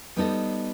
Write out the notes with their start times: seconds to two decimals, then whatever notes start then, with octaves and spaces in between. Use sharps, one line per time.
0.17 G3 B3 D#4 A4 D#5